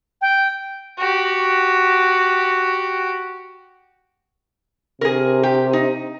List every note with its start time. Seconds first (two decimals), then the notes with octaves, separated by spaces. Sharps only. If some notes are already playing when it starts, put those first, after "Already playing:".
0.21 G5
0.98 F#4 G4
5.01 C3 G#4 A#4
5.43 G4
5.73 D#4